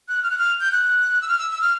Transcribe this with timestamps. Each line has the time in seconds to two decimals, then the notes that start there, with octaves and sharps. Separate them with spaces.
0.09 F#6
0.23 F6
0.30 F#6
0.38 F6
0.61 G6
0.72 F#6
1.22 E6
1.28 F6
1.38 E6
1.51 E6
1.61 F6